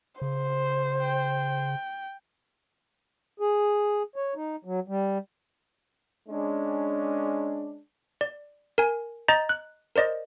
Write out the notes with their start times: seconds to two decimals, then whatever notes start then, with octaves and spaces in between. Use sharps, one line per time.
0.22 C#3 C5
1.02 G5
3.40 G#4
4.16 C#5
4.35 D#4
4.65 F#3
4.88 G3
6.29 G#3 C#4 D4
8.21 D5
8.78 A#4 G#5
9.28 D#5 A#5 G6 A6
9.49 F#6
9.96 A#4 C5 D5 D#5